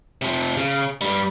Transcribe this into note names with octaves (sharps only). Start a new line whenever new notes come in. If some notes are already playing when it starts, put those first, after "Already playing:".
C3 F3
C#3
G2 G3